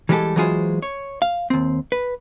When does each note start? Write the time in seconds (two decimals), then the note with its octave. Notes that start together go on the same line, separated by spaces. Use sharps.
0.09 E3 G3 G#3 F#4 G4 A4
0.36 E3 F#3 G#3 F4 G#4 C5
0.82 C#5
1.22 F5
1.50 D#2 C4
1.92 B4